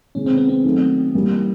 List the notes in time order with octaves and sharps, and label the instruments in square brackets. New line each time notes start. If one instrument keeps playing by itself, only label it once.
[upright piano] C3 D#3 G#3 [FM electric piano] C#4
[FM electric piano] C4
B3
C4
[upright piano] D#3 F#3 A3
E3 G3 A#3 C#4